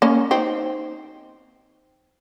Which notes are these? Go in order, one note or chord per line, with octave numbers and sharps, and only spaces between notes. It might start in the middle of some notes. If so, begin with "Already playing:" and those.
A#3 C#4
C4 D#4